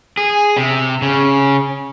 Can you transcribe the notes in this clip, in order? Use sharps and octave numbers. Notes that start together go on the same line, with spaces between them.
G#4
C3
C#3